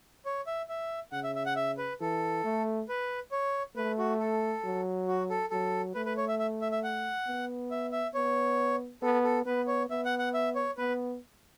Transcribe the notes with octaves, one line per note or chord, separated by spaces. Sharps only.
C#5
E5
E5
C#3 F#5
E5
E5
F#5
E5
B4
E3 A4
A3
B4
C#5
A3 B4
F#4
A4
F#3
F#4
A4
F#3 A4
A3 B4
B4
C#5
E5
E5
E5
E5
F#5
B3
E5
E5
B3 C#5
B3 A4
A4
B3 B4
C#5
B3 E5
F#5
F#5
E5
C#5
B3 B4